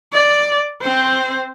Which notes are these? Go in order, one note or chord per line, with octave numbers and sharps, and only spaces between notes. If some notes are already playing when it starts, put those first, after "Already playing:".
D5
C4 C5